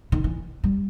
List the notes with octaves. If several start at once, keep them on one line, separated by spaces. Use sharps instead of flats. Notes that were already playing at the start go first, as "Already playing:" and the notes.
D#3
E3
G3